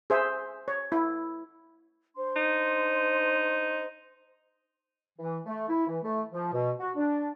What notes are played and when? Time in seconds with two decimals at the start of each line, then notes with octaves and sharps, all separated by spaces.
0.10 G#4 C5 E5
0.68 C#5
0.92 E4
2.16 D4 C5 C6
2.36 D#4
5.19 E3
5.45 A3
5.69 E4
5.87 E3
6.03 A3
6.31 F3
6.53 B2
6.80 F#4
6.95 D4